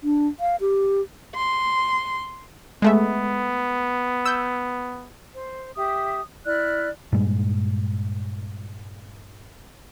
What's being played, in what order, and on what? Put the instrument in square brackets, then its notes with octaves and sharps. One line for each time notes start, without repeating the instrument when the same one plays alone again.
[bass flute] D4
F5
G4
[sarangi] C6
[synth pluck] G#3 A3 E5 [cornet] B3
[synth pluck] E6 G6
[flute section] C5
G4 E5 D#6
E4 D5 F6 F#6
[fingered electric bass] G2 A#2 G3 G#3